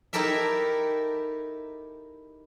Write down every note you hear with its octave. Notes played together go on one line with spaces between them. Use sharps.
D#4 E4 G4 A4 A#4 E5